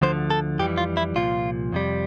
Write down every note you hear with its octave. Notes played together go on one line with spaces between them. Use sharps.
D2 D3 F3 C5
A4
F2 E3 G3 G4
F4
E4
C2 A#2 F3 F4
F2 C3 G3